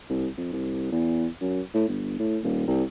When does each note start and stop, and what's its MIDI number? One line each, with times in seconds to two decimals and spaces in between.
0.10 0.28 36
0.37 0.48 41
0.53 0.90 36
0.92 1.27 40
1.41 1.61 42
1.74 1.86 45
1.88 2.15 31
2.19 2.38 45
2.43 2.65 27
2.67 2.84 36